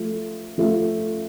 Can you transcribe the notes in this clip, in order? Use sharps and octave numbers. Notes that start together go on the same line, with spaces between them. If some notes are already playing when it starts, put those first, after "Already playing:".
Already playing: F3 A3 F4
F3 A3 F4